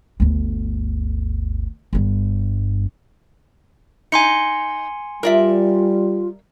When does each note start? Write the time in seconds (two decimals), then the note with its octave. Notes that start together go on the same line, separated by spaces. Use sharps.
0.20 G1 D2
1.93 G1 G2
4.12 D#4 G#5 C6 C#7
5.23 G3 F4 A#4 D5 E5